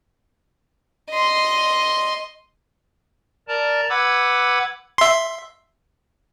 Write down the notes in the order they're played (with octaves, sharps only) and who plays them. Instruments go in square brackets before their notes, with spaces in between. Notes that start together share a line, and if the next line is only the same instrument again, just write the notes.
[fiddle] D#5 C6
[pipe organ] A#4 D5 A5 A#5
B4 F#5 B5 D6 E6 G#6
[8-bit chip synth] E5 C6